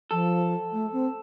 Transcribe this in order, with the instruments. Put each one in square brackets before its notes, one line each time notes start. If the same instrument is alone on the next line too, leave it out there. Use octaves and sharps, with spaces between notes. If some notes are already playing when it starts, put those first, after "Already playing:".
[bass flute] F3 [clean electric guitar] A4
[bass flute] A3
C4